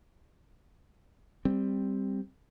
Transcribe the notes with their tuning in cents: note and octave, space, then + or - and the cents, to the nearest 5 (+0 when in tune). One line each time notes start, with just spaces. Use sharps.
G3 +10 C4 +0